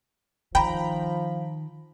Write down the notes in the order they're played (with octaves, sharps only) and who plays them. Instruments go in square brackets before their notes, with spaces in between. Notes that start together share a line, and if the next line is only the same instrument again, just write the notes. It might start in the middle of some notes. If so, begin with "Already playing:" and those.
[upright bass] D#3 [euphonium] F3 [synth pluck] G5 [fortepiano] A#5 B5